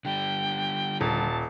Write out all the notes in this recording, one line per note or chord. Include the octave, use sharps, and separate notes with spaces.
D3 G3 G5
D#1 A5